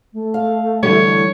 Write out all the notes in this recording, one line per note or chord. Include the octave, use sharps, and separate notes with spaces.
A3
F5
D3 E3 G3 C#5